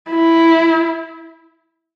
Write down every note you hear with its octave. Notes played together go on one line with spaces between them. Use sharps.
E4